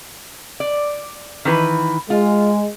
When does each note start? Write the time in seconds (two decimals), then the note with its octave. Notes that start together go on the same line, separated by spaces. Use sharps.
0.60 D5
1.45 D#3 E3 B4
2.10 G#3 F4